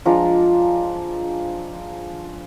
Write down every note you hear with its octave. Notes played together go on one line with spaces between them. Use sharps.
F3 G#3 D4 A#5